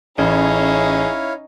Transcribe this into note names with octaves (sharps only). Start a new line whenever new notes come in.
A1 C#4 D#4 E4 G#4 C#5 F5